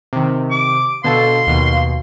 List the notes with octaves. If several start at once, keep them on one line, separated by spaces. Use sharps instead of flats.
C3 D#3
D6
B2 D3 A4 F5 C6
D#2 B2